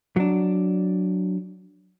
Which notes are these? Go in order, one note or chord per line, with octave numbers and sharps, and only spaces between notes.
F#3 D4